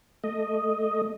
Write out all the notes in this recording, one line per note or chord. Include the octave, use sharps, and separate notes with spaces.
A3 D#5